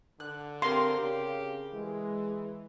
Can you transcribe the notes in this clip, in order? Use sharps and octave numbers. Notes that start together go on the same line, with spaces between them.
D3 F#6
C4 G4 A#4 F5 C6
C#3 G4
E3 G#3